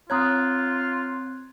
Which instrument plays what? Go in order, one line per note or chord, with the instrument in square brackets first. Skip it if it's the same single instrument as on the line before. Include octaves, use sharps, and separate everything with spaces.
[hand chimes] C4 F#6 G#6 [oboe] F4 [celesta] C#5 A#5 D#6